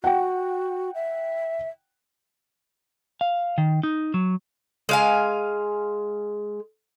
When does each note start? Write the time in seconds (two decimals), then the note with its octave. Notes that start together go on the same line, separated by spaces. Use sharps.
0.04 F#4 F#5 G5
0.95 E5
3.21 F5
3.58 D#3
3.83 D#4
4.14 F#3
4.89 G#3 F5 G#5